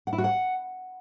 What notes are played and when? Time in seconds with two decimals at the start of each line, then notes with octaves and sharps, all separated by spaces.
0.07 F#5
0.13 E4
0.18 F#4
0.24 F#5